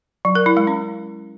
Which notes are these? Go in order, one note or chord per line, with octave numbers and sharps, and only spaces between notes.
F#3
A#4
E4
G#3
C#4